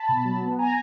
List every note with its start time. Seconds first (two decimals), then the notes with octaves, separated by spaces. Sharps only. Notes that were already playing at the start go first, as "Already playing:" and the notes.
Already playing: A5 B5
0.09 B2
0.25 F#3
0.42 B3
0.59 G#5 A#5